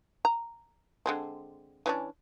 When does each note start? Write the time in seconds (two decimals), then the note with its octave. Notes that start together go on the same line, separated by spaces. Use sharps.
0.25 A#5
1.06 D3 G#3 C4
1.86 E3 C#4 D4